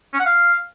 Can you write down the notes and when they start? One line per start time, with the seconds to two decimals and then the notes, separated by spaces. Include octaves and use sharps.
0.13 C#4
0.19 F#5
0.26 F5